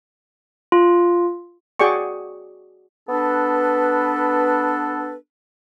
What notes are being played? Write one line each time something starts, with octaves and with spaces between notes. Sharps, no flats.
F4
F#4 G#4 D5 G5 C#6
B3 D4 A4 B4